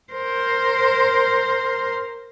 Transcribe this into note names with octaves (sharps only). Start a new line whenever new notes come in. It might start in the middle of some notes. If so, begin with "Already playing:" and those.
A#4 C5